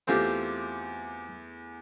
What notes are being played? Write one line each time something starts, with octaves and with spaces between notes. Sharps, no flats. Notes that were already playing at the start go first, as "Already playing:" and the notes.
E2 A3 C4 F4 G4